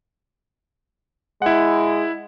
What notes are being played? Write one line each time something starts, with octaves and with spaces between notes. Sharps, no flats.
G#3 E4 F#5